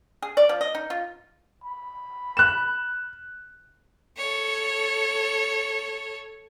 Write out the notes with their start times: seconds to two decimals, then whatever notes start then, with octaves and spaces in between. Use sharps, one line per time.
0.22 G#4
0.37 D5
0.49 F3
0.61 D#5
0.75 D#4
0.90 F4
1.64 B5
2.37 F#6 E7
4.18 A4 C#5